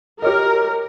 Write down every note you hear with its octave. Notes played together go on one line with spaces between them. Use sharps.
G4 A#4 C#5 D#5